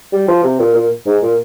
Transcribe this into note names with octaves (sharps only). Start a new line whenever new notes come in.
G3
F3
C3
A#2
A#2
G#2
A#2